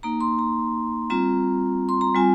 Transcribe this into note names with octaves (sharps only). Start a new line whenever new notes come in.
A#3 D#4 A#5
C6
A#5
G3 C4 F4 A#5
C6
A#5
G3 C4 F4 G#5